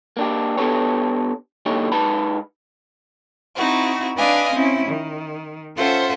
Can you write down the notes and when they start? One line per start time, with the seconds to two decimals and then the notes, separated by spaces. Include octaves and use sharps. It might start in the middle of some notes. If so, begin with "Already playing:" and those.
0.17 A#3 D4 G4
0.57 B3 D4 G4 A4 B4 C#5
1.66 B1 D3 A#3 D#4 G4 C#5
1.92 G#2 D#4 B4 A5 B5
3.55 C4 D#4 E4 F#4
4.17 D4 B4 D5 D#5 F5 G#5
4.53 C4 C#4 E4
4.88 D#3
5.76 C#4 F4 A4 C5 E5 F#5